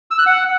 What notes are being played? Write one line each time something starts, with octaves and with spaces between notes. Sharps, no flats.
E6
F#6
F#5